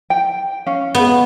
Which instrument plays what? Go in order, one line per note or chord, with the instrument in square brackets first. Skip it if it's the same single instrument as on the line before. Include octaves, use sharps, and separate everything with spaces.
[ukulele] G5
C#4 F5
[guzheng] B3